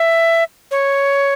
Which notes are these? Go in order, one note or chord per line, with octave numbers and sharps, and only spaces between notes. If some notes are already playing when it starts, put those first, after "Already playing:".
Already playing: E5
C#5